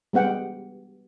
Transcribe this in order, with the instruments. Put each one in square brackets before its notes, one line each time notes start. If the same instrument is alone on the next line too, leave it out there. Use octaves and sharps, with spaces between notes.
[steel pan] G3 G#3 B3 F#5 G5